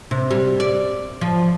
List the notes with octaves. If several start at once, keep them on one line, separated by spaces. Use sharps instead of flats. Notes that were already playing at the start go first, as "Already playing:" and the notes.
C3
G3
D5
F3